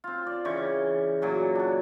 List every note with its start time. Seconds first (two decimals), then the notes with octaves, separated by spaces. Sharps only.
0.04 C4 F4
0.26 D5
0.45 C#3 E3 G5 C#6
1.22 A#2 F#3 F#4 G#5
1.55 D4 F#4